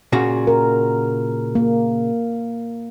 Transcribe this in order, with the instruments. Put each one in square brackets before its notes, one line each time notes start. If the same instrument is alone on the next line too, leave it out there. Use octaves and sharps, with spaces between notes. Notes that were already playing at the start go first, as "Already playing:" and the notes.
[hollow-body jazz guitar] A#2 C#3 F#4
[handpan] A#4
A#3